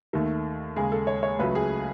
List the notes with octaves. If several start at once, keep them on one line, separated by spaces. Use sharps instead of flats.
D#2 D#3 A3
D#2 C#3 G#3 G#4
A4
C#5
C#5
C#2 C#3 F#3 A3 B4
G#4